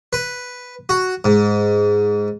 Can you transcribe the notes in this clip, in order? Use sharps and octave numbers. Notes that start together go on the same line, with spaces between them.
B4
F#4
G#2